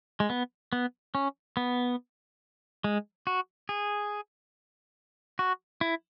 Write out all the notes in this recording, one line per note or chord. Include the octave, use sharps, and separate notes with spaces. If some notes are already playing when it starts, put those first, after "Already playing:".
G#3
B3
B3
C#4
B3
G#3
F#4
G#4
F#4
E4